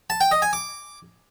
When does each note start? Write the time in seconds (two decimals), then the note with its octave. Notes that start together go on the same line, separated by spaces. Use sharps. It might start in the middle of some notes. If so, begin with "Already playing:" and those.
0.10 A5
0.21 G5
0.31 D#5
0.42 G#5
0.53 D6